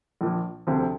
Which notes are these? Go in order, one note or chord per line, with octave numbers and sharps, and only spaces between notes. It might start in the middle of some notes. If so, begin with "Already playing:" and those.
A#1 A#2 F3
D2 C3 F3